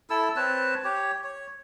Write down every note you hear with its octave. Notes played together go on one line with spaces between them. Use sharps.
E4 A4 E6
C4 B4 C#5 A5
G4 C#5
C#5